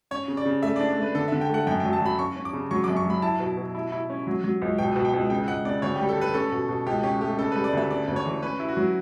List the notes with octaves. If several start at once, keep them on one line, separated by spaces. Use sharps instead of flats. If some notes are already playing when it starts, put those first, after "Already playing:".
C#4 C#5
C#3
D5
C#3
A3 E5
D5
D4
D5
A3 B4
D3 A4
E5
D3
G5
A3 F#5
F#2 G5
F#3 G5
A5
F#3 B5
C#4 C#6
C#4
D6
C#3
F#3 C#6
F#2 D6
C#6
F#3 B5
E4 A5
B2
B2
E4
E4
C#4
F#3
F#3
C#2
B2 G5
B2
G5
C#2
C#3 G5
C#2 F#5
C#3 D5
D2 C#5
G4
G3
A4
G3 B4
C#4 A4
B2
B2
C#2 G4
C#4 G4
A3 G4
C#3 A4
G3 B4
D5
D2 E5
C#3 D5
D2
C#5
E3
C#4 B4
E4
F#4
F#3